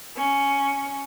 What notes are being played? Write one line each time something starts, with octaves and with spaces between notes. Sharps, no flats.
C#4